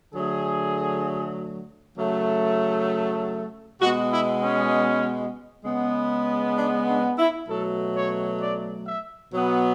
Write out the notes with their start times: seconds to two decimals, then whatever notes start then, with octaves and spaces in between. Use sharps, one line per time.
0.14 D3 F#3 A3 G#4
1.98 C#3 F#3 A3
3.81 B2 G#3 B3 F#4
4.12 E4
4.43 C#4
5.64 C#3 G#3 B3
6.57 D4
6.88 D4
7.19 E4
7.48 B2 F#3 A3 A4
7.95 C#5
8.41 D5
8.86 E5
9.32 B2 F#3 B3